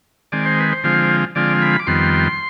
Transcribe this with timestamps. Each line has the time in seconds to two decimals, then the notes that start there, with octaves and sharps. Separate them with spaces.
0.32 D#3 G#3 C4 D5
0.46 C5
0.60 B4
0.72 C5
0.83 D3 F3 G#3 C4 F4
1.35 D3 F3 G#3 C4 F4 D5
1.62 B5
1.79 D6
1.87 F2 D#3 G3 B3 C6